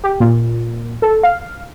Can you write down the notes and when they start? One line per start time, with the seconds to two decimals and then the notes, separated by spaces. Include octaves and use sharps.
0.04 G4
0.20 A#2
1.02 A4
1.23 F5